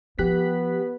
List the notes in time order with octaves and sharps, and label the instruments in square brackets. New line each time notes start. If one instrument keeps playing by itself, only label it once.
[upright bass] F3 [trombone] B3 [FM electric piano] G4 F#6 B6